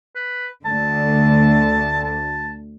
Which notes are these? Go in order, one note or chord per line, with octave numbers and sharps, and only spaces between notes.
B4
D2 D3 A5
A5